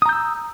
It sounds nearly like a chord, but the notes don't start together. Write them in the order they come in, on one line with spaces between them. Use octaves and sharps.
D#6 A#5 G6 E6